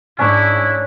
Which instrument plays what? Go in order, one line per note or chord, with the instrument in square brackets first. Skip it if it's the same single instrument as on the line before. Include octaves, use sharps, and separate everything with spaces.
[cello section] G#2 [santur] C#4 D4 C#5 [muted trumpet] E4